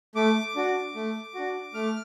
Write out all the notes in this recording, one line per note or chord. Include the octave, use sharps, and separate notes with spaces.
A3 D6
D4 F#4
A3
D4 F#4
A3 F6